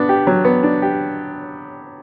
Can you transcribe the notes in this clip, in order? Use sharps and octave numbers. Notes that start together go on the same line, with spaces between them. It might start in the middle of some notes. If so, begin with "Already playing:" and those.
Already playing: B3 D4
G4
F#3
B3
D4
G4